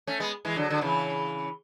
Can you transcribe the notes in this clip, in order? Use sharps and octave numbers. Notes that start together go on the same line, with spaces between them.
A3 C#4
G#3 B3
E3 G#3
D3 F#3
D3
C#3 E3